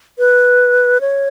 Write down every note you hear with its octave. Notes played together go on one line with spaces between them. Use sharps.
B4
C#5